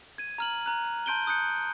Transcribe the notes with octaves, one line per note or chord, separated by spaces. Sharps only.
G#6 D#7
A#5 F6 F#7
A#5 F#6
A5 C6 G6 D7 D#7 G7
D#6 F#6 G6 C#7